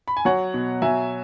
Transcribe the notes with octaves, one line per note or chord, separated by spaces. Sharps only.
B5
G#5
F#3 C#5 F#5
B2
F#3 E5 G#5